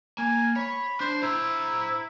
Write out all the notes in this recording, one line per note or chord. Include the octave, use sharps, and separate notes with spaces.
A#3 G#5
C#5 B5
D4 C5
E4 C5 A#5